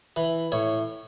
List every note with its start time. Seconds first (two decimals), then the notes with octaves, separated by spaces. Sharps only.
0.16 E3 B4
0.52 A2 C#5